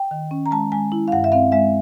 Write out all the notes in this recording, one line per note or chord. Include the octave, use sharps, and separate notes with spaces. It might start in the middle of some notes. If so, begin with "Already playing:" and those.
Already playing: G5
D#3
C#4
A#5
G#3 A5
G#3 G#5
E4
F5
G2 F#5
E5
C4 F5
G#3 E5